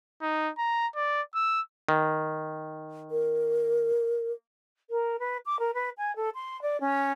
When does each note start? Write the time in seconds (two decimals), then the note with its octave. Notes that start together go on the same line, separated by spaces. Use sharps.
0.22 D#4
0.58 A#5
0.96 D5
1.35 E6
1.89 D#3
3.11 A#4
4.90 A#4
5.19 B4
5.46 D6
5.59 A#4
5.74 B4
5.97 G#5
6.16 A4
6.35 C6
6.62 D5
6.80 C#4